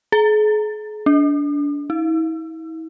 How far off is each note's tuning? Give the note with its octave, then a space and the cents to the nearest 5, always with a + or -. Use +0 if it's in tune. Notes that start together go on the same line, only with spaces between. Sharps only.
G#4 +40
D4 -25
E4 -40